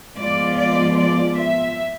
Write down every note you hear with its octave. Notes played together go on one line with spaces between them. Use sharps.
F3 G#3 B3 F4 D5
D5
D5
E5